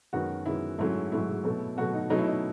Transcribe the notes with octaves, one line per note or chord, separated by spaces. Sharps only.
F#2 D#3 G#3 B3 F#4
F#2 D#3 G#3 B3 E4
G#2 F#3 A3 C#4 E4
G#2 F#3 A3 C#4 E4
B2 F#3 A3
B2 F#3 A3 F#4
D#4
B2 F#3 A3 C#4 D#4
E4
D#4